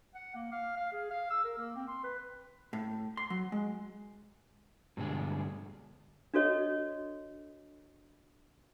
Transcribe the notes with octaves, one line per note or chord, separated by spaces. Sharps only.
F#5
A#3
F5
F5
G#4
F5
E6
A#4
A#3
C4
C6
B4
A2
C6
F#3
G#3
G2 B2 D3 G#3
D4 F#4 A4 C#5 D#5